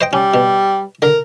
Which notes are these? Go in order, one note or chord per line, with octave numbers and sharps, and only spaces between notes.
C5 D#5 G5
G3 C#4
B2
D3 A#4